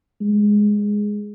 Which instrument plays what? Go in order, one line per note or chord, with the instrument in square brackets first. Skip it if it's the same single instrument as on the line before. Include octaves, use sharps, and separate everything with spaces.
[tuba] G#3